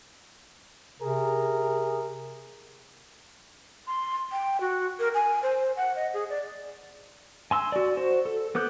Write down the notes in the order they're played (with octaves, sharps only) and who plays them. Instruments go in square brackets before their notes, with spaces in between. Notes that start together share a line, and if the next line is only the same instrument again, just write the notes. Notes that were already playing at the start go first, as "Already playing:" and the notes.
[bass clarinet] C3 [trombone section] G#4 A#4
[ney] C6
G5
F#4
A#4
G#5
C5
F#5
D#5
G#4
D5
[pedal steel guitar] G#5 C6 E6
F#4 D5
F#4 C5
A4
B3 A4 D6 F#6 G6